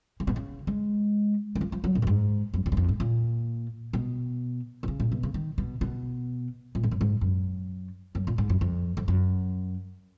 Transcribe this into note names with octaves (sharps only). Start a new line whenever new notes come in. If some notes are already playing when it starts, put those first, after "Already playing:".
C#3
B2
C#3
G#3
D#3
F3
F3
F#3
A#2
F#2
G#2
F#2
F2
F#2
F2
G#2
A#2
B2
B2
C#3
A#2
B2
C#3
D#3
B2
B2
A#2
G#2
F#2
G#2
F#2
F#2
A#2
G#2
F#2
F2
F2
F#2